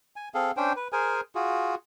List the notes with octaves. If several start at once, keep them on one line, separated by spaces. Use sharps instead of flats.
G#5
C4 G#4 A4 F5
C#4 D4 C5 G5
B4
G#4 A#4 C5 G#5
F4 F#4 G#4